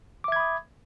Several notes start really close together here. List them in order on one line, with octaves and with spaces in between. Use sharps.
D6 E5 G#6 B5 D#6